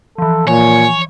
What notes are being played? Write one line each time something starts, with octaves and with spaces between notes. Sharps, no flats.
E3 F3 A4
A#2 C#5 G#5